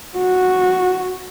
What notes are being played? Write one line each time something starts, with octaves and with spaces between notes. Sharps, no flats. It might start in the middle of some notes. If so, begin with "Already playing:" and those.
F#4